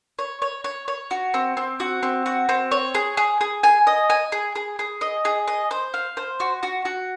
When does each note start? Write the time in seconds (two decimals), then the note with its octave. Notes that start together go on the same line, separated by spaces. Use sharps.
0.19 C#5
0.42 C#5
0.64 C#5
0.88 C#5
1.11 F#4
1.34 C4
1.57 C4
1.80 F#4
2.03 C4
2.26 F#4
2.49 C4
2.71 C#5
2.95 G#4
3.17 G#4
3.41 G#4
3.63 G#5
3.87 D#5
4.10 G#5
4.32 G#4
4.55 G#4
4.79 G#4
5.01 D#5
5.25 G#4
5.48 D#5
5.71 C5
5.94 F5
6.17 C5
6.40 F#4
6.63 F#4
6.85 F#4